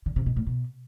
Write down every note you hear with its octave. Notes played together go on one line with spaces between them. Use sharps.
D3
C3
B2
A2
B2